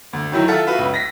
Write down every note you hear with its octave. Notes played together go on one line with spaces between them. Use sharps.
D2
D#3 F#3 E4 F#4
F4 A4 E5 F#5
F#4 B4 E5 F5
C#2
A#6 B6